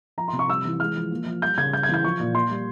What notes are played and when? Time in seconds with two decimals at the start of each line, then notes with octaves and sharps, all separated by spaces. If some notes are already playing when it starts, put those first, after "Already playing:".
0.18 F3 A#5
0.28 C3 C6
0.39 C#6
0.49 G3 E6
0.65 E3
0.80 G#3 F6
0.96 F3
1.11 A#3
1.26 F3
1.42 G3 G6
1.58 C#3 G#6
1.72 G3 G6
1.83 G#6
1.89 E3 G6
2.04 F3 C#6
2.20 A#2
2.34 A#3 C6
2.50 G3